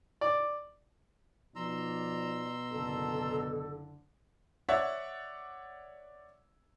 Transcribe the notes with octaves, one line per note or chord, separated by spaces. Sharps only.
D5
B2 F3 D#4 D5 A#5 C6 E6
F#1 D3 A4
C#5 D5 E5 F#5